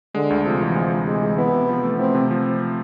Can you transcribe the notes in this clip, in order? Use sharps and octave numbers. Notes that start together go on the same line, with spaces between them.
D3 G#3
D2
C3 F3
E3
G#3
D2
C3 G#3
E3
B3 E4
C3
F3
A3
C4 E4
C3
F3